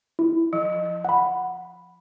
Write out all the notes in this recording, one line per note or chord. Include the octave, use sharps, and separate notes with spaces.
E4
F3
F#5 B5